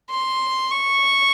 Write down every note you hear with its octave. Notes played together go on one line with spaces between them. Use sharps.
C6
C#6